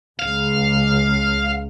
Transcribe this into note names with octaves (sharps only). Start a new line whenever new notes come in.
C#2 F5